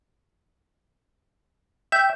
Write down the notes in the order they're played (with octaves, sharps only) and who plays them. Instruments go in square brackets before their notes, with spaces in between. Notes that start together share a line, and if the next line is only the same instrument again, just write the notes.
[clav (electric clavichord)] E5 [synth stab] G5